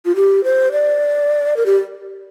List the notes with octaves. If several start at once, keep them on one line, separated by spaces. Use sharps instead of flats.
F4
G4
C5
D5
A#4
G4